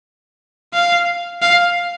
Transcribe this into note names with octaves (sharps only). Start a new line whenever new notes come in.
F5
F5